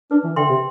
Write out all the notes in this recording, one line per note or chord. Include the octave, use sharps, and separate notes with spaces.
D4 B4
E3
D3 E5 G5 C6
C3